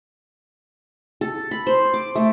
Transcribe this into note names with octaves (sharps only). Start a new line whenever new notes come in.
A4
B5
C5
D6
A3